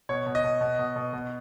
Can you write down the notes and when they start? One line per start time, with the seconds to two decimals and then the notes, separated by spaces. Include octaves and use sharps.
0.09 B2 C#5
0.27 B2
0.35 D#5
0.44 B2
0.61 B2
0.79 B2
0.96 B2
1.13 B2